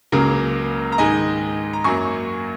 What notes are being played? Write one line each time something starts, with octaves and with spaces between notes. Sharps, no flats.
C#2 C#3 F#3 A#3 A#4
A#5
G#2 D#3 G#3 D#5 G#5
A#5
F#2 F#3 A#3 G#5 C#6